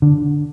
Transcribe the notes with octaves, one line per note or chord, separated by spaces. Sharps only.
D3